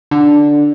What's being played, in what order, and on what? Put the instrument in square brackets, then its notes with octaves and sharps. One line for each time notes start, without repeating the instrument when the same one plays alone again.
[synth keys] D3